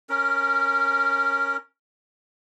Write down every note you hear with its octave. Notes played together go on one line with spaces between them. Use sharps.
C#4 A#4